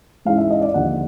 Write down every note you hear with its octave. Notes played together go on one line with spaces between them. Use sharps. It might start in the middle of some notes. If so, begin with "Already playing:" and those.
G#2 E3 G#3 C#4 F5
E5
D#5
D5
D#2 D3 F3 F#5